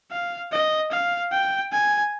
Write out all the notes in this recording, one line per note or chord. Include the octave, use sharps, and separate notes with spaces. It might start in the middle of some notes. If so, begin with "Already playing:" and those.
F5
D#5
F5
G5
G#5